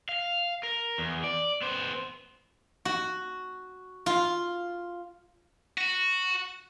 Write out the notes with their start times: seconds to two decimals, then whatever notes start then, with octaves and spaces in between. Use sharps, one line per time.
0.09 F5
0.63 A#4
0.98 E2
1.24 D5
1.61 B3 C5
2.85 F#4
4.06 F4
5.78 F#4